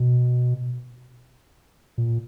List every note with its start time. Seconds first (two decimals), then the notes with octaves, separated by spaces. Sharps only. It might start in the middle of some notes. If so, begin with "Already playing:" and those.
Already playing: B2
1.98 A#2